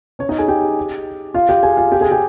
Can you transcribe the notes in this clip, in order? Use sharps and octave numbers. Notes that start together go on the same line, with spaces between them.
C#4 C#5
D#4 D#5
G#4 G#5
G4 G5
F4 F5
G4 G5
G#4 G#5
F4 F5
G4 G5
G#4 G#5
G4 G5